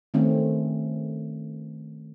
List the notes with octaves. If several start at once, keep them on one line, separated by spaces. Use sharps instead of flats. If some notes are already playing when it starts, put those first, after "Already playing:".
D#3 A3 C4 C#4